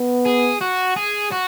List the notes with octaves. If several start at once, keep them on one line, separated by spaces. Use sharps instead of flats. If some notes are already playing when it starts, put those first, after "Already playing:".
Already playing: B3
G#4
F#4
G#4
F#4